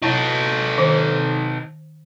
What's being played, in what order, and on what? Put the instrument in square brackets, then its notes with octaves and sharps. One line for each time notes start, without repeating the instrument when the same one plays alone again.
[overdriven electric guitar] D#4 A4 [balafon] E4 C#5
[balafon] D#3 C5